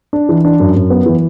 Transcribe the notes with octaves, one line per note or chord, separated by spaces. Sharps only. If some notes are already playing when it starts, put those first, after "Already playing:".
D4
E3
D4
F#2
F#2
B3
E3